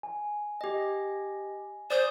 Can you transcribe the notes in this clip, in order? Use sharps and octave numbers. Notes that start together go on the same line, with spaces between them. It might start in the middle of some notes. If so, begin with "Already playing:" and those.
G#5
G4 D#5
C5 D5 D#6 G6